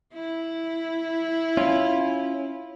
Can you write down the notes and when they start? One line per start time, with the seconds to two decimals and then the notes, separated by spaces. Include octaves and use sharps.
0.14 E4
1.57 C#4 F4